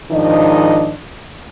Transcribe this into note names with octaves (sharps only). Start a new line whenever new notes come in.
G#2 D#3 F3 D4 D#5